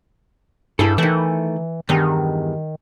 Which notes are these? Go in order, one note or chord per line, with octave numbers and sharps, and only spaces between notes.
G2 E4 G#4 A4
D#3 E3 A3
E2 G2 D#3